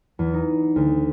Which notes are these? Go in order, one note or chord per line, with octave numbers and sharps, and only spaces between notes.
E2
D#4
D2